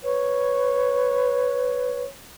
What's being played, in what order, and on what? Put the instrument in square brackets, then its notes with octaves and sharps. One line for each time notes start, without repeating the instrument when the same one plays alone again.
[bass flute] B4 [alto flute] C#5